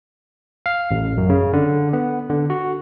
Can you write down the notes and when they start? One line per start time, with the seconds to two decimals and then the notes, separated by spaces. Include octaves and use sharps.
0.66 F5
0.91 A1
1.17 F#2
1.29 C#3
1.53 D3
1.93 B3
2.30 D3
2.50 F#4